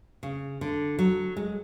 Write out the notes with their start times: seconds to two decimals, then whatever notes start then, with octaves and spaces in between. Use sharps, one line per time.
0.23 C#3
0.61 D3
0.99 F#3
1.37 G#3